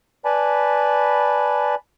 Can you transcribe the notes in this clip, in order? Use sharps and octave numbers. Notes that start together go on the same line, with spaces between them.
B4 D5 G#5 A5 B5